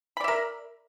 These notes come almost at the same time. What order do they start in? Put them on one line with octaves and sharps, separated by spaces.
B5 D5 E5 A#4